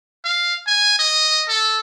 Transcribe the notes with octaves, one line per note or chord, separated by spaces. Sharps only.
F5
G#5
D#5
A4